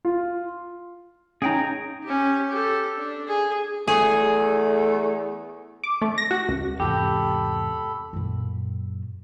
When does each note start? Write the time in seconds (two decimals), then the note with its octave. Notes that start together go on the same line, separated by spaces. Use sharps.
0.05 F4
1.42 C#4 D#4 G#4 G5 A#5
2.04 C#4 G4
2.50 G4 A4
2.98 D4
3.27 G#4
3.88 E2 A3 G#4
5.84 D6
6.02 A3
6.18 A#6
6.31 F#4
6.48 C#2
6.80 E2 G#2 C3 G4 A4 B5
8.13 F#2 A#2